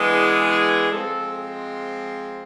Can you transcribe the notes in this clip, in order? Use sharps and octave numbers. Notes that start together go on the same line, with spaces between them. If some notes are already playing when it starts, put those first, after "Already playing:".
Already playing: E3 G#3 B3 D4
G#4
G#4
F3 G#3 C4 A4